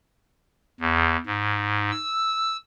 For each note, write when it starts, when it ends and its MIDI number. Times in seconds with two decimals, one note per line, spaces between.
0.80 1.16 40
1.26 1.91 44
1.91 2.56 88